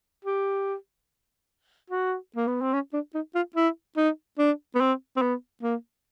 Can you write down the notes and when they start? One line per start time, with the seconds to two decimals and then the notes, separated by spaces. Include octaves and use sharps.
0.25 G4
1.90 F#4
2.36 A#3
2.48 B3
2.61 C4
2.74 C#4
2.93 D4
3.15 D#4
3.35 F4
3.56 E4
3.97 D#4
4.39 D4
4.75 B3
4.81 C4
5.17 C4
5.22 B3
5.63 A#3